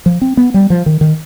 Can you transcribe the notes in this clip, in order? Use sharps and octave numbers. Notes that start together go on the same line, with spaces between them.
F3
C4
B3
G3
F3
D#3
D#3